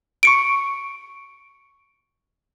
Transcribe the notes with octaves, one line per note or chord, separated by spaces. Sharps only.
C#6 C#7 D7